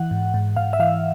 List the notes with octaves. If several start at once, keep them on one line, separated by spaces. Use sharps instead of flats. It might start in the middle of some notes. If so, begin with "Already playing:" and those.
Already playing: E3 F#5
G#2
G#2
G#2 F5
E5
E3 F5